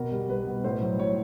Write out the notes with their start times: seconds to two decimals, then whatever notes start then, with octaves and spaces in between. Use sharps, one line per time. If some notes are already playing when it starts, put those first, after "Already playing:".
Already playing: B2 A#4
0.12 G3
0.29 G3 B4
0.47 B2
0.64 A2 C5
0.82 F#3
0.99 F#3 C#5